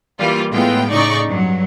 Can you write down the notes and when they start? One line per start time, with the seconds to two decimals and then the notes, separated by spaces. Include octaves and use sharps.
0.19 E3 G3 A#3 F4
0.51 A2 G#3 B3 F4 G5
0.91 A2 C#3 D#4 D5 C#6
1.27 G2 F#3